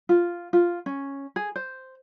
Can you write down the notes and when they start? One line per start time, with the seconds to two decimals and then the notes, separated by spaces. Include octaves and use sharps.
0.09 F4
0.53 F4
0.86 C#4
1.36 G#4
1.56 C5